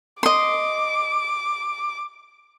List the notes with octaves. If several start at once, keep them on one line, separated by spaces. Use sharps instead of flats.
D#5 C6 D6